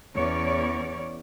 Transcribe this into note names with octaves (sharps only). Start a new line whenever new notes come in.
E2 C#4 C#5 D5